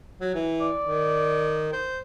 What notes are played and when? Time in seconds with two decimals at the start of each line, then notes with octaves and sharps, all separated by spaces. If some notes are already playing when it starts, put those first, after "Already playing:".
0.21 F#3
0.34 E3
0.61 D5
0.84 D#3
1.73 C5